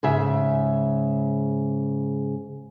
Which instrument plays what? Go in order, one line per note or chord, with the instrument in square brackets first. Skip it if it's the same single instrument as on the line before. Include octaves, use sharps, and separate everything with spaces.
[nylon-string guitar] G#2 C#3 E5